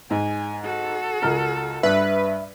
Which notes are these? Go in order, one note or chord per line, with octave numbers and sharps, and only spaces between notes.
G#2 G#5
F#4 A4
C#2 A#4
G2 B4 E5